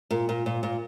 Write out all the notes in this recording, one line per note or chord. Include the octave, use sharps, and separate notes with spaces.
A#2
A#2
A#2
A#2